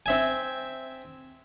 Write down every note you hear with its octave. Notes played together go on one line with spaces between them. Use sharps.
C4 E5 G#5